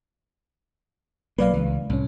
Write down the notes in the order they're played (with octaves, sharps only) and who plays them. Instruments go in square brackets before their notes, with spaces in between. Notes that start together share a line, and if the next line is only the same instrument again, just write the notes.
[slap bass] B1 F#3 A#3 [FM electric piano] B4 D5 F5
[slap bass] C#2 [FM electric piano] E3
[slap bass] C2 [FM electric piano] A2 C#4